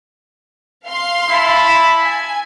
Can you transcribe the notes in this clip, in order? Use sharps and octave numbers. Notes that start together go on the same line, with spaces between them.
F5 C6
E4 A5 B5
G#5